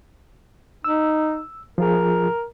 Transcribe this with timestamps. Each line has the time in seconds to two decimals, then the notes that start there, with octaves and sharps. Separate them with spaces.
0.84 D#4 E6
1.78 F3 F4 G#4 A#4